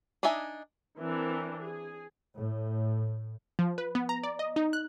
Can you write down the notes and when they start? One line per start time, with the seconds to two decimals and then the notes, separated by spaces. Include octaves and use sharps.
0.23 D4 D#4 D#5 E5 G#5
0.98 E3 C4 D4 A#4
1.62 G#4
2.36 A2
3.59 F3
3.78 B4
3.95 B3
4.09 A#5
4.23 D5
4.39 D#5
4.56 D#4
4.73 F#6